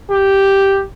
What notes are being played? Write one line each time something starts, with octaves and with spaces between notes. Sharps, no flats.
G4